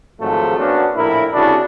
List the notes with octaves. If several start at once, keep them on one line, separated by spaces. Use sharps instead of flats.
G#1 G#2 F3 F#3 A3
A#3 B3 C#4 D4 F#4
A#1 A2 E4 A#4
C2 C#3 D4 E4 F#4